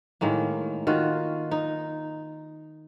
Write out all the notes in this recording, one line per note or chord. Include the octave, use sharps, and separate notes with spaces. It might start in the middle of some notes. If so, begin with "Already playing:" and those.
A2 D#3 G#3 A#3
D#3 F4 F#4
D#4